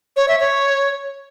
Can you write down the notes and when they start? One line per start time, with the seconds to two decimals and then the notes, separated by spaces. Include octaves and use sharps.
0.16 C#5
0.28 E5
0.40 C#5